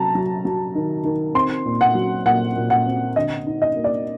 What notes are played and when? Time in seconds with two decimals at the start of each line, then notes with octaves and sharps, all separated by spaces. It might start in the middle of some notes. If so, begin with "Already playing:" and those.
Already playing: C3 F#3 A5 A#5
0.15 F#3
0.45 F#3
0.75 D#3
1.04 D#3
1.34 C4 C6
1.66 A#2
1.81 F#5
1.95 F#3
2.26 A#2 F#5
2.56 A#2
2.70 F#5
2.86 C4
3.16 D3 D#5
3.47 D#4
3.62 D#5
3.76 A#3
3.84 D5